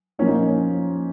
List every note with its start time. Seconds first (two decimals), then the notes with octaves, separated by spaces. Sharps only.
0.19 A#2 F3 A#3 C#4
0.27 D#4
0.31 A#3 C#4